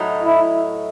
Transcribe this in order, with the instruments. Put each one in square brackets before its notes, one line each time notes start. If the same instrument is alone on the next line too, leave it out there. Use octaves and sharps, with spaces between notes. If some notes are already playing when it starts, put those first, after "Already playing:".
Already playing: [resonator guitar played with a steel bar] A2 F#3 A3 D#4
[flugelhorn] E4